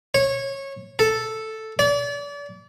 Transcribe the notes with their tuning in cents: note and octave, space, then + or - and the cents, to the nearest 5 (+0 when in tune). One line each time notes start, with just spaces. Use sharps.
C#5 -20
A4 +0
D5 -35